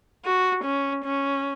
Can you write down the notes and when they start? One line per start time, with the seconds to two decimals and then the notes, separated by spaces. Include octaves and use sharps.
0.25 F#4
0.65 C#4
1.05 C#4